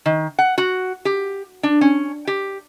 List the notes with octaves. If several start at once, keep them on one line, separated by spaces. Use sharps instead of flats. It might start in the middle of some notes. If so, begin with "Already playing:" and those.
D#3
F#5
F#4
G4
D4
C#4
G4